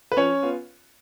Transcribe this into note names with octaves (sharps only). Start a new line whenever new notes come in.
B4
F3 C#4 C#5
B3 F4